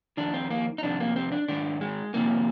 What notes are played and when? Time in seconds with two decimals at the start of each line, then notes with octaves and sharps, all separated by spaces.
0.17 F2 D#3 D4
0.34 C4
0.51 A#3
0.78 D#4
0.83 F2 C3 D#3 D4
1.00 A#3
1.16 C4
1.32 D4
1.48 G#2 D#3 D4
1.81 G#3
2.14 F2 C3 D#3 A#3